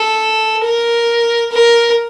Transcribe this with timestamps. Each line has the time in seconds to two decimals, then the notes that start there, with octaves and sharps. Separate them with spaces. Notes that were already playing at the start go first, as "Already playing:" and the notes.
Already playing: A4
0.64 A#4
1.52 A#4